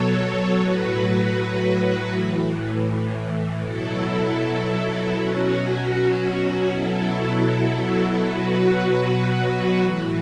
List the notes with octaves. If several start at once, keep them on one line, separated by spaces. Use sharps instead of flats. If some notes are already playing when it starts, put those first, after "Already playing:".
Already playing: B2 F#3 A4 C#5
A2 F#3 F#4 B4
A2 E3
B2 F#3 E4 A4
B2 F#3 C#4 F#4
B2 F#3 E4 A4
B2 F#3 F#4 B4
A2 E3